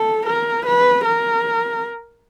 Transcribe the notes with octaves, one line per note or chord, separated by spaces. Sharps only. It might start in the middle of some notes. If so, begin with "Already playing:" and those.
Already playing: A4
A#4
B4
A#4